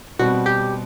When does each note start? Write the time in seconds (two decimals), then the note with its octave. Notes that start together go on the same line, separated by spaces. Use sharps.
0.19 B2 G3 C4 F#4
0.46 G4